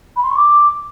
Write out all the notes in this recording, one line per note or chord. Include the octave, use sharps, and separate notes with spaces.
B5
C6
C#6
D6